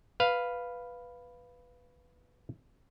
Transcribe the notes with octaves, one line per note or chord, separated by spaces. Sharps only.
B4 F5